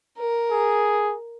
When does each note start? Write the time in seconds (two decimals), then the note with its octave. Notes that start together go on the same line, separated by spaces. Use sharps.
0.17 A#4
0.51 G#4